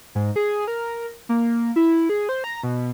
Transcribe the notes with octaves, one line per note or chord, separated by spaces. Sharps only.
G#2
G#4
A#4
A#3
E4
G#4
C5
A#5
B2